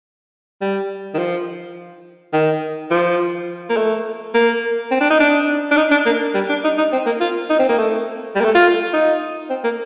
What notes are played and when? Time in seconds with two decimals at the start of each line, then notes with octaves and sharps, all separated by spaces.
0.61 G3
1.14 D#3
1.18 F3
2.33 D#3
2.91 F3
3.70 A#3
3.76 A3
4.34 A#3
4.91 C4
5.01 D4
5.10 D#4
5.20 D4
5.71 D4
5.77 D#4
5.91 D4
6.06 A#3
6.34 G3
6.49 D4
6.64 D#4
6.78 D#4
6.92 C4
7.06 A#3
7.20 F4
7.50 D#4
7.59 C4
7.69 A#3
7.78 A3
8.35 G3
8.40 A#3
8.45 A3
8.55 F4
8.93 D#4
9.50 C4
9.64 A#3